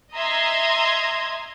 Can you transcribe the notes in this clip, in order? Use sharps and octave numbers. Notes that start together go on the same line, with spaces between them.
D#5 E5 A#5 C6 D#6 G#6